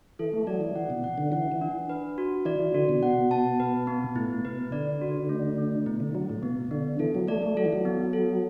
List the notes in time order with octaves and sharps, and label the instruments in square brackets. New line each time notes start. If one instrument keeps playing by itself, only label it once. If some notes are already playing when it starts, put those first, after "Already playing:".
[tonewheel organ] E3 [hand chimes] A4
[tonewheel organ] A3
[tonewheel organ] F#3 [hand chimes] D5
[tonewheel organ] E3
[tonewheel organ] E3 [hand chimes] F#5
[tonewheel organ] B2
[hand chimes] F#5
[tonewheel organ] D3
[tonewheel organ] E3 [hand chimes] F#5
[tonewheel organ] E3
[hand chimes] D4
B4
F#4
[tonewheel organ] E3 [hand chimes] D5
[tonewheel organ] E3
[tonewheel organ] D3 [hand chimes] F#4
[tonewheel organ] B2
[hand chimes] F#5
A5
B4
B3
[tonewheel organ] A2 [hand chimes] E4
[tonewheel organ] B2 [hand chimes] B4
[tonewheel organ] D3 [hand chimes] D5
[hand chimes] F#4
A3
A3
[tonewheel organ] B2 [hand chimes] E4
[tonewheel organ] D3
[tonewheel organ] F#3 [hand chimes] E4
[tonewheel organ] A2
[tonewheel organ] B2 [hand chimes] B3
[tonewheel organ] D3 [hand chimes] B3
[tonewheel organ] E3 [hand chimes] A4
[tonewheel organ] F#3
[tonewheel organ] A3 [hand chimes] D5
[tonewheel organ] A3
[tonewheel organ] F#3 [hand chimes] A4
[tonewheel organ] E3
F#3
[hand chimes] B3
A4